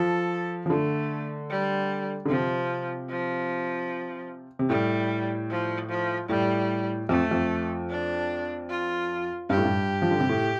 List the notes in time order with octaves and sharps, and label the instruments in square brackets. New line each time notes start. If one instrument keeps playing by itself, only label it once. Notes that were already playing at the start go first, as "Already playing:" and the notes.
Already playing: [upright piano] F3 [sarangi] A4
[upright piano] F3
[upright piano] D3 [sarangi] A3
[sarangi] G3
[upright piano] D3
[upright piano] C3 [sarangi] F3
[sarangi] F3
[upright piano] C3
[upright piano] A2 [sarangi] G3
[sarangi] F3
F3
[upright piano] A2 [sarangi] G3
[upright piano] F2 [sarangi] A3
[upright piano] F2
[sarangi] D4
F4
[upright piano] G2 [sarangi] G4
[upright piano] A2
G2
F3
D3
C3
A2